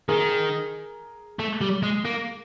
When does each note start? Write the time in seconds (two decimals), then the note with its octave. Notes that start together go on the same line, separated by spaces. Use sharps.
0.08 D#3 G#4 A#4
1.39 A3
1.61 G3
1.83 G#3
2.05 A#3